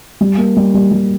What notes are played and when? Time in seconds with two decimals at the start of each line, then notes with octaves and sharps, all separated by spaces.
0.21 G3
0.38 A#3
0.57 G3
0.74 G3
0.92 G3